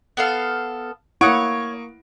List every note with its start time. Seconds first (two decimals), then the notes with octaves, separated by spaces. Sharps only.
0.17 B3 A4 F5
1.21 A#3 E4 C#5 F#5 C#6 D#6 D7